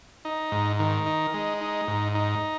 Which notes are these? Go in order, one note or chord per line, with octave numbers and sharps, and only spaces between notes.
D#4
G#2
D#3
D#4
G#3
D#4
G#2
D#4